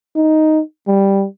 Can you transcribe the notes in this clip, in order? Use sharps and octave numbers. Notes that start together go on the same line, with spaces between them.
D#4
G3